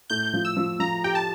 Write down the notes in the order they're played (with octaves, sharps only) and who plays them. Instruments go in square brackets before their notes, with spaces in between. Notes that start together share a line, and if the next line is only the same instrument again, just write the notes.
[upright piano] A2 [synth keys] G6
[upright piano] F3
[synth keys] E6
[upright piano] F3
[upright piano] F3 [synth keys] A#5
[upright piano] G4 [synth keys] G5
[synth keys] A5